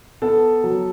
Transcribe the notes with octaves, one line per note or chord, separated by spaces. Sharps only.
B3 A4
F#3